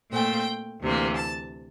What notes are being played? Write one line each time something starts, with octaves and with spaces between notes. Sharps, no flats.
A#2 A3 C4 G5
D2 C3 E3 A#3
A5